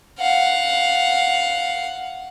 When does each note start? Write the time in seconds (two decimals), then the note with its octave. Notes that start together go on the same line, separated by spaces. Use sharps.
0.19 F5 F#5